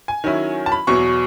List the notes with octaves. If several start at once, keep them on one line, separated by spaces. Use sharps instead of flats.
G#5
D#3 F#3 C#4 E4
A5
B5
E2 B2 F#3 C#6